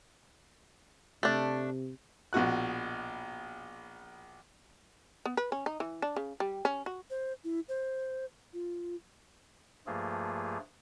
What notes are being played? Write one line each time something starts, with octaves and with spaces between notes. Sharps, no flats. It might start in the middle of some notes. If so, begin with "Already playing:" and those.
C3 A3 D4
A#1 B2 F#4 F#6
B3
B4
C#4
D#4
E3
D4
C#3
G3
C#4
F#4
C5
E4
C5
F4
G2 F3 A3 A#3 F4 G#4